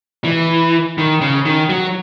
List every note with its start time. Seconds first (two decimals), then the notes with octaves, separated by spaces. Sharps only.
0.24 E3
0.98 D#3
1.21 C#3
1.45 D#3
1.70 F#3